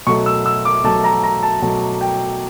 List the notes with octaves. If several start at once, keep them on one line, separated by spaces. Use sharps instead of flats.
B2 F#3 A3 C#6
E6
E6
D6
B2 F#3 A3 A5
A#5
A#5
A5
B2 F#3 A3
G5